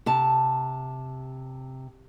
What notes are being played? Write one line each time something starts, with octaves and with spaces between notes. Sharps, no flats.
C3 A5